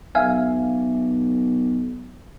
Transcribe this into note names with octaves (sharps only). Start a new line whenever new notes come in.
B1 E5 F5 G#5